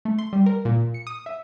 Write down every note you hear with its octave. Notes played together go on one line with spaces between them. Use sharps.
A3
C6
G3
A#4
A#2
C#7
D#6
E5